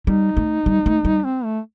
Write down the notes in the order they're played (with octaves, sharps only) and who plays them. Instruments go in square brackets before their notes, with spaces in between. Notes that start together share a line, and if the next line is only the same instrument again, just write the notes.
[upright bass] G3 [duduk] D#4
[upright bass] A3
G3
A3
G3
[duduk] C4
A3